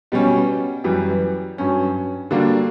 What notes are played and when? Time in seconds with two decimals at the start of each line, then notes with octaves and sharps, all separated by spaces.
0.12 B2 G3 C#4
0.84 F#2 E3 G3
1.58 G2 F#3 C#4
2.31 D3 G3 A#3 D4 F#4